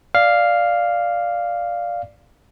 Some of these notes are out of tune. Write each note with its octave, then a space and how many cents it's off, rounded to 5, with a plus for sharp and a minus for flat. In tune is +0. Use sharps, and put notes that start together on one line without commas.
D5 +0 F5 +0